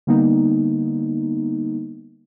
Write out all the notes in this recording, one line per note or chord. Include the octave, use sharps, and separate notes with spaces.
D3 G3 A#3 B3 D#4